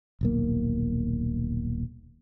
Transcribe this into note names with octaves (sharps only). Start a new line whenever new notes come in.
D#1 B1 A#3